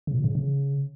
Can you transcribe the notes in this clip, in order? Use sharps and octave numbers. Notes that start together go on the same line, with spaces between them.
C#3
A#2
C#3
C#3